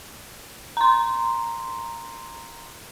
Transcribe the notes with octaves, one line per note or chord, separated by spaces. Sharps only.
A#5 C6